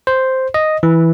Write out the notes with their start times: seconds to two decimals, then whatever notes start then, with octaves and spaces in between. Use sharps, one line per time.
0.07 C5
0.54 D#5
0.83 E3